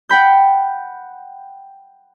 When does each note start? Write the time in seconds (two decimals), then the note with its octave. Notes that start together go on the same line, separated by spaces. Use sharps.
0.09 F#5 G5 B5 G6